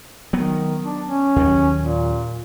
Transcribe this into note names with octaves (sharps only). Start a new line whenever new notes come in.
D#3 F#3 B3
D4
C#4
D#2 D#3 F#3
A#2